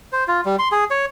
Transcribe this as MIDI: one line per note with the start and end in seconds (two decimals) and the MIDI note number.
0.12 0.24 72
0.28 0.41 65
0.45 0.56 55
0.59 0.68 84
0.72 0.84 68
0.91 1.06 73